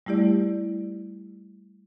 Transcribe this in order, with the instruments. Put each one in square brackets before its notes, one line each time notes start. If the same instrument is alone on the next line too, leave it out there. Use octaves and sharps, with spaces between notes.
[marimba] G3 A3 E4 G4 D5